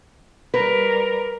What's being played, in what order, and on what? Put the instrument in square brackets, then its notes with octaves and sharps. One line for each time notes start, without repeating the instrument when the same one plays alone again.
[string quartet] G3 A#4 [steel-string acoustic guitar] B4